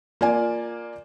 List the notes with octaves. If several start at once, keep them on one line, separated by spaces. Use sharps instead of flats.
A#3 F4 D5 G#5